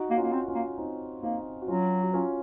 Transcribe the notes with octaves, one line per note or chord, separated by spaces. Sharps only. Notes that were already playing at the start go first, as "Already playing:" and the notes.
Already playing: D#4 F#4
A#3 F#4
C#4 F4
A#3
C4
C#4 F4
A#3
C4 D#4
A#3 C4 D#4
F#4
F#3 C#4 F4
F#4
C#4 F4